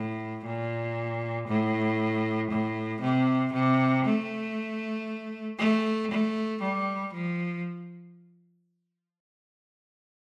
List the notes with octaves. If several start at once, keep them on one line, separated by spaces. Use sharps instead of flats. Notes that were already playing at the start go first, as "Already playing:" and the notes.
Already playing: A2
A#2
A2
A2
C3
C3
A3
A3
A3
G3
F3